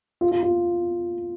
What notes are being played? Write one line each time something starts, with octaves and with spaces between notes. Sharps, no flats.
F4
F4
F4